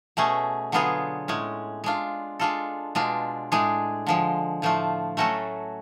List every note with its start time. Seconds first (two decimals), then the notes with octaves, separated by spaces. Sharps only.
0.17 B2 A3 C#4 G#4
0.72 D3 F#3 B3 F4 G#4
1.28 A2 G#3 C#4
1.84 G#3 D4 F4
2.40 G#3 D4 F4 A4
2.95 B2 G#3 D4 F4
3.52 A2 G#3 D4 G#4
4.07 D3 F3 G#3
4.62 A2 F3 A3 F4
5.17 F#3 A3 C#4 F#4 A4